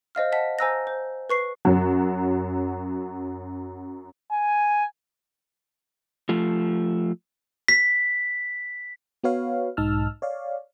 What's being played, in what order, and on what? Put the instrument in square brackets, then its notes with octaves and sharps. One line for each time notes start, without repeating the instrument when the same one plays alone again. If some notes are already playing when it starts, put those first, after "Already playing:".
[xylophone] C5 D#5 F5 F6
D#5 F#5 A5 B6
C5 G#5 A#5 E6 F#6 A#6
C5
B4 C#6 C7
[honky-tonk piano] F#2 F#3
[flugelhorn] G#5
[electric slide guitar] F3 A3
[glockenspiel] B6
[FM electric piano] B3 F#4 B4 C#5 F5
B1 G#2 D#4 A5 E6 F6
C#5 D5 F5